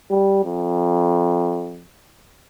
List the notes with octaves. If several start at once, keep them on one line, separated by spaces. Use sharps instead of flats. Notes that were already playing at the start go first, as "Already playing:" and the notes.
G3
F2